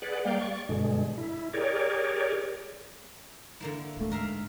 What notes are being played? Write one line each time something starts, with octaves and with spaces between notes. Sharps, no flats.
G#4 B4 D5 F#5
G3 A#3 D5 F5 G5
D5 C#6
G2 B2 D3 G#3
E4
G4 G#4 A#4 C#5 D5
D3 A#3 E4
D1 A3
G#2 A#4 E5 F5